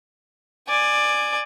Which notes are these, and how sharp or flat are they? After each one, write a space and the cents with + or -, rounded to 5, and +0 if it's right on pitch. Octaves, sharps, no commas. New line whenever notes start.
D5 +15 G#5 +0